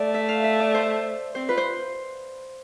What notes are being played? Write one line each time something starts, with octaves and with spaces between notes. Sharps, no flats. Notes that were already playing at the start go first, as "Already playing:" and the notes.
Already playing: A3 D5
E5
F5
E5
D5
C5
C4 C5
F4 B4
C5